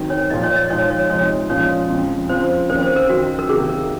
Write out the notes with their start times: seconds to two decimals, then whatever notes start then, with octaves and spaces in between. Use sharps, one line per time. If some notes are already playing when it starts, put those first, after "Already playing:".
Already playing: D#3 F#3 C4 D#4
0.10 C#5
0.30 A#2 F3 A#3 D#5
0.43 C#5
0.56 D#5
0.70 F3 G#3 D#4 C#5
0.90 C#5
1.10 C3 F3 G#3 D#4 C#5
1.50 A#2 F3 G#3 C#4 C#5
1.90 F2 C#3 F3 G#3
2.29 C#3 F3 C4 F4 C5
2.69 F2 D#3 A#3 C#4 C5
2.82 C5
2.96 A#4
3.09 F#2 D#3 F#3 F#4
3.39 A#4
3.49 C3 D#3 A#3 D#4 F#4 G#4
3.69 A#4